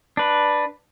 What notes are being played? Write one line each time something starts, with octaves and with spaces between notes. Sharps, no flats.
D4 B4